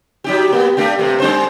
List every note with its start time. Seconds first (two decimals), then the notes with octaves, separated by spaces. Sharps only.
0.24 F#3 D#4 G4
0.52 A#3 B3
0.77 A3 D4 G4
0.98 G2 C3 A3
1.20 G3 D4 C5